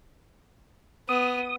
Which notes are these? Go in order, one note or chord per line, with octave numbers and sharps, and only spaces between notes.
B3 D#6